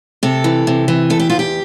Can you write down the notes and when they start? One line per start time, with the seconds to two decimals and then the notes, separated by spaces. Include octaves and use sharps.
0.23 C3 A4
0.44 E3
0.67 C3
0.88 E3
1.10 E2 A4
1.20 G4
1.30 E2 F4
1.39 G4